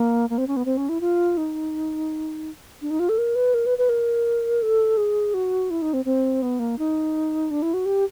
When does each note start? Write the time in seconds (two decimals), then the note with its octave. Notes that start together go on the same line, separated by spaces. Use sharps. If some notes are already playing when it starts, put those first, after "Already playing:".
Already playing: A#3
0.30 A#3
0.38 C4
0.47 C#4
0.57 B3
0.65 C4
0.77 C#4
0.89 E4
1.01 F4
1.37 D#4
2.82 D4
2.90 D#4
3.00 F4
3.09 A4
3.18 A#4
3.35 B4
3.54 A#4
3.66 B4
3.78 B4
3.89 A#4
4.62 A4
4.97 G#4
5.34 F#4
5.70 E4
5.82 D#4
5.94 C4
6.05 C4
6.42 B3
6.59 A#3
6.79 D#4
7.51 D4
7.62 E4
7.74 F#4
7.86 G4